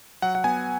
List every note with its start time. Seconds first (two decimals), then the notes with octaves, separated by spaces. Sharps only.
0.22 F#3 F#5
0.35 F#5
0.44 B3 G#5